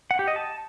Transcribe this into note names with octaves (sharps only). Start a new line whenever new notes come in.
F#5
G4
D#5
A5